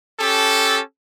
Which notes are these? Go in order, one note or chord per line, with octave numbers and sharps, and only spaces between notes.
C#4 G4 A4